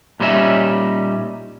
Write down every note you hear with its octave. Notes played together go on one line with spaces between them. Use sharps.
A#2 G3 C#4 D#4 F#4 E5